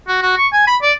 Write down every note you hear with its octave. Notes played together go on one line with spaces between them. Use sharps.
F#4
F#4
C#6
G#5
B5
D5